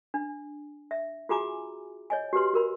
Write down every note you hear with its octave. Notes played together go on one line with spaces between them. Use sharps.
D4
E5
F4 F#4 G#4 G#5 A#5 D6
C#5 D#5 G#5
F#4 G4 B4 C6
F#4 A#4 B5